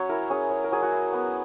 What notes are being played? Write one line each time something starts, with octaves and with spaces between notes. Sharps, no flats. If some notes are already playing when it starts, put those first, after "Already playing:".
Already playing: F#3 C#4 C#5
E4 A#4
C#4 G#4
F#3
A#4
F#3 G#4
F#4
E4
B3